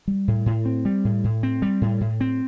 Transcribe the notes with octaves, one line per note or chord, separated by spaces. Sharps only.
G3
A2
A2
C4
G3
A2
A2
C4
G3
A2
A2
C4